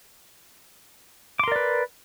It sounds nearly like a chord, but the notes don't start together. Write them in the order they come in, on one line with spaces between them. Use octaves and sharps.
D6 C6 A#4 D5 B4